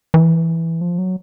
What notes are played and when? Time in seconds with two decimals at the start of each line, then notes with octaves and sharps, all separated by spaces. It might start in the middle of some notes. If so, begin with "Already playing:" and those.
0.14 E3
0.81 F3
0.98 F#3